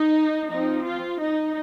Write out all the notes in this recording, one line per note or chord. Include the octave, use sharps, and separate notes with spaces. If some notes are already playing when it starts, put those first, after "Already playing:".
Already playing: D#4
F3 C4 D#4
F4
D#4